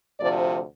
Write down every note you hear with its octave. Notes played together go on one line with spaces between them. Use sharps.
D2 C3 F3 D5